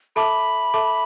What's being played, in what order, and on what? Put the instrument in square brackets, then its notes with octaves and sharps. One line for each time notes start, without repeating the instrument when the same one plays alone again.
[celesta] A4 E5 A5 D6 [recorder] B5
[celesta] A4 E5 A5 D6